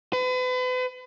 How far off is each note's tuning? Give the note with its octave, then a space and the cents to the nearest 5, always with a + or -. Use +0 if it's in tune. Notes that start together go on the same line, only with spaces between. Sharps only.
B4 +40